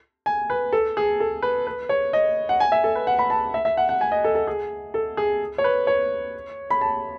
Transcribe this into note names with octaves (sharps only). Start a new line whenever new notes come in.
G#5
B4
A4
G#4
A4
B4
B4
C#5
D#5
F#5
G#5
E5
A4
B4
F#5
B5
A5
E5
E5
F#5
F#5
G#5
D#5
A4
A4
G#4
A4
G#4
C#5
B4
C#5
B5
A5